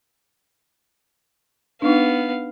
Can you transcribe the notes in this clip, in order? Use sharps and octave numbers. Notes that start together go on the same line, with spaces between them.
B3 D4 D#4 F5